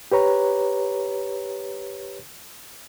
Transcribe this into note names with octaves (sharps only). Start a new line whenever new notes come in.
G4 B4 C#5 A#5